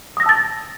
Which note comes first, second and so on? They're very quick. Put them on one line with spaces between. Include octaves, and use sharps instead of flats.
D#6 A#6 E6 A5 A6